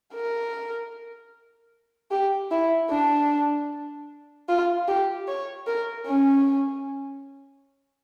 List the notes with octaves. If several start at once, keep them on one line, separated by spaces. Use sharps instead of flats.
A#4
G4
E4
D4
F4
G4
C#5
A#4
C#4